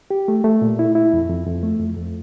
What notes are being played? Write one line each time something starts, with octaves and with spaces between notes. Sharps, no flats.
G4
A3
A3
A#2
E4
E4
F2
F2
F2
A3
F2
F2